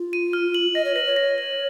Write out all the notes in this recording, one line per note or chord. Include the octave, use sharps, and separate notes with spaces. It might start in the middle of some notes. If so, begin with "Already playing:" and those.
Already playing: F4
D#7
F6
F#7
D#5 A#6
C#5
B4 A#6
C#5
A#6
A#6